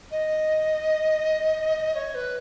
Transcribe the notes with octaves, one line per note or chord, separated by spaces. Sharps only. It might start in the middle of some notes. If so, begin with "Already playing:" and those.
D#5
C#5
B4